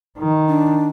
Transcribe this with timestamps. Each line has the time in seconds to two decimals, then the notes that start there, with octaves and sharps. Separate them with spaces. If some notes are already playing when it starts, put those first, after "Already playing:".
0.18 D#3
0.49 D4